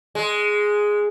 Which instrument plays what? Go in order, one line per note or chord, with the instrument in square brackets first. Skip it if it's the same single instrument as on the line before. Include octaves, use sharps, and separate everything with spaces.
[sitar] G#3